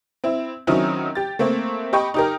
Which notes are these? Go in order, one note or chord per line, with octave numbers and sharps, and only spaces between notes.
C4 E4
D#3 F#3 C4 C#4 D#4 E4
G4 A6
A3 A#3 C4
G4 D#5 G5 B5 C#6
D#4 G4 A#4